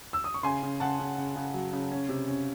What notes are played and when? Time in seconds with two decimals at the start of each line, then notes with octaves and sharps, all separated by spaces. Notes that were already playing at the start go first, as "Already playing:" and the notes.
0.13 E6
0.24 D#6
0.34 C#6
0.43 C#3 G#5 C6
0.63 C#3
0.80 C#3 F#5 A5
0.99 C#3
1.18 C#3
1.36 C#3
1.54 F#3
1.73 C#3
1.91 C#4
2.09 C3
2.27 C#4